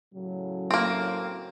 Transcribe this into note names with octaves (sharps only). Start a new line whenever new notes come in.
A2 C#3 F#3
A#3 C4